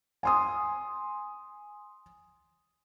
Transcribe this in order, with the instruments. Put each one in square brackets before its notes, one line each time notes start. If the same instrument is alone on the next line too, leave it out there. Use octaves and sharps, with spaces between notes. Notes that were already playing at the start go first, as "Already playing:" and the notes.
[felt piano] G#5 C6 D#6